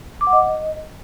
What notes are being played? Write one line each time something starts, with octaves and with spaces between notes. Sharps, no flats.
D6
F#5
D#5